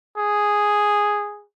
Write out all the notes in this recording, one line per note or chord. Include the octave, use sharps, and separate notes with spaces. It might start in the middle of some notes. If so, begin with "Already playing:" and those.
G#4